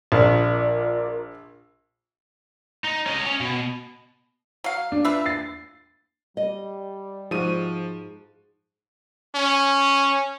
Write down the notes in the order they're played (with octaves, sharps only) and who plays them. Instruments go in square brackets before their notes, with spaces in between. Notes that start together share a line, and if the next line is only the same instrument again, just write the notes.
[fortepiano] A#1 [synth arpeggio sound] F4 A#4 D5
[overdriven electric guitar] D#4
C#4 D#5
C#4
B2
[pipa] F#3 F5
[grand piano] D4
[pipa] F4 B4 E5
[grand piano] A6 C7
[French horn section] G3 [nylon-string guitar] D#5
[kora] G#2 F#4 [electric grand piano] F3 D#7
[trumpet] C#4